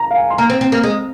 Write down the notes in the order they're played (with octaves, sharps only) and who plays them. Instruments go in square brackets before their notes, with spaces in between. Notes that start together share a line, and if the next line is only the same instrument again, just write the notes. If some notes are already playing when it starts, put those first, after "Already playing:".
Already playing: [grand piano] A#5
F5
G#5
C6
[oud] A#3 [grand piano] A#5
[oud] C4
C4
A#3
G#3